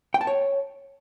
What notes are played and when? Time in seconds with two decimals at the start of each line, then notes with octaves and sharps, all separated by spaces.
0.14 G5
0.21 A5
0.27 C#5